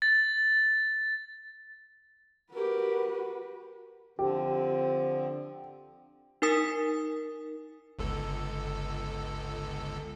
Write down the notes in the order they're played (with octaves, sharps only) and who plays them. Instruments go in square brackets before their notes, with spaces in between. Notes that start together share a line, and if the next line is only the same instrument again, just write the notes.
[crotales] A6
[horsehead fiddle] F#4 B4 [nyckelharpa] G4 A#4
[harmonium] D3 F3 C4 [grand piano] G4
[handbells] D#4 A#4 G#5 D#6 B6
[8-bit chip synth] G1 C#2 A4